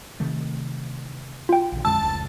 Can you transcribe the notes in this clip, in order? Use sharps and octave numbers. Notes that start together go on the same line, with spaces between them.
C3 D#3 A3
F4 G5
A#1 D3
F2 D3 G#3 A5 E6
F1 C#2